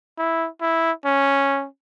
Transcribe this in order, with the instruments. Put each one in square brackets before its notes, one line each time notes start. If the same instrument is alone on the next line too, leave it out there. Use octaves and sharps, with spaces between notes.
[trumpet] E4
E4
C#4